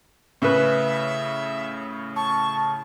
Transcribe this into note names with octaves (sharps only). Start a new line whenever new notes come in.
A2 C#3 C#4 B4 E5
A5 C#6